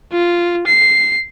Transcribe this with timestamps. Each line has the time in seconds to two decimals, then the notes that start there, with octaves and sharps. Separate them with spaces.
0.12 F4
0.67 C7